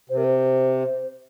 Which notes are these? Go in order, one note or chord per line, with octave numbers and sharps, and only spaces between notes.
C3 C5
A#4
C5